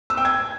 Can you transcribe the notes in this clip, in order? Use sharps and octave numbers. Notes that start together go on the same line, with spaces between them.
E6
G5
G#6